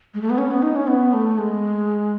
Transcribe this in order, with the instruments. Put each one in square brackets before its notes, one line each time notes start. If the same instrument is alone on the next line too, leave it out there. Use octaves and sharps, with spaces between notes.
[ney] G#3
A3
B3
C#4
B3
D#4
C#4
B3
A3
G#3